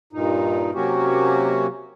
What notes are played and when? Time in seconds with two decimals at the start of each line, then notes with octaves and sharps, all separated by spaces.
0.13 G2 A#2 D#4
0.74 C3 F#3 A#3 C#4 F#4 G4